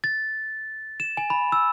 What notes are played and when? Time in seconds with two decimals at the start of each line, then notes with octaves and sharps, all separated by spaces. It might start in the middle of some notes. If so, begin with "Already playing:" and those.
0.04 A6
1.00 E7
1.17 G#5
1.30 B5
1.52 E6